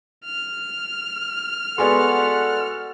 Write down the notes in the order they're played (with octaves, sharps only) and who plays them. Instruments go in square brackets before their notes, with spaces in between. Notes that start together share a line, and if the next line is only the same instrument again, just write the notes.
[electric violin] F6
[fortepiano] G#3 B3 [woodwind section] F#4 A4 F#5 [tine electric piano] D5 G#5 C6